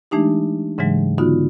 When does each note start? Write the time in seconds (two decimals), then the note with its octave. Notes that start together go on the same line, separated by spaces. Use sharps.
0.11 E3 G#3 A3 D4 D#4 G4
0.78 G#2 C#3 E3 F#3 G#3
1.18 D3 B3 D#4 F4 F#4